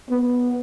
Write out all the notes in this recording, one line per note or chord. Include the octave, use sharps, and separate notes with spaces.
B3